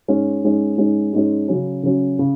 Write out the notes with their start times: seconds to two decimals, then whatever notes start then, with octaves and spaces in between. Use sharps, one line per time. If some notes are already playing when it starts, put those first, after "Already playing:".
0.08 G#2 G#3 C#4
0.44 G#2 G#3 C#4
0.78 G#2 G#3 C#4
1.13 G#2 G#3 C#4
1.48 C#3 F#3 C#4
1.83 C#3 F#3 C#4
2.19 C#3